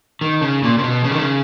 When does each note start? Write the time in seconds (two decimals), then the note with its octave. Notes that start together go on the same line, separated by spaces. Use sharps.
0.21 D#3
0.42 C#3
0.63 A#2
0.78 C#3
0.84 B2
1.04 C#3
1.12 D#3
1.18 C#3